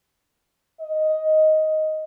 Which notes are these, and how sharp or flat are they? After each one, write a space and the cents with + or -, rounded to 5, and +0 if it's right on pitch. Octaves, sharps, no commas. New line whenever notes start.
D#5 +5